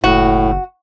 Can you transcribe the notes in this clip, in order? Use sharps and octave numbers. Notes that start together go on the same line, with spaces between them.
F#1 A2 F#4